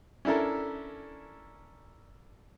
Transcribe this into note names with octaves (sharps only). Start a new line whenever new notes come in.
C#4 D4 E4 A4 A#4